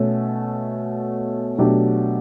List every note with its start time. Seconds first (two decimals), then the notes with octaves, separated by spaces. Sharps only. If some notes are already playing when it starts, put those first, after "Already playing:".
Already playing: B2 A3 C#4
1.58 B2 F#3 A3 D4 G4